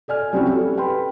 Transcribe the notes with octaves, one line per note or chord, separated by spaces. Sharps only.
A4 D5 G#5 F6
G3 C4 C#4 E4 F#4 G4
G4 A4
B4 G5 B5 C6